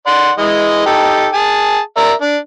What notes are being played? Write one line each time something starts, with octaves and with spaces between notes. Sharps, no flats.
D5 F#5 C6
E3 G#3 D#5
D#4 G4 A4
G#4 A5
A#4 D5 E5
D4